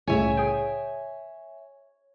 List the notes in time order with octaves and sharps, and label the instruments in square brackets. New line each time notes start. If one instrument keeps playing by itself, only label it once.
[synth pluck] C2 A2 C#3 [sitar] C#5 [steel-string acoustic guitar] E5 G#5
[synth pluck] G#4 G5